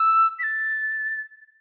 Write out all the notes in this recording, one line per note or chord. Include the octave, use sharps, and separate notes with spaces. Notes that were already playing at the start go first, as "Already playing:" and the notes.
Already playing: E6
B6
A6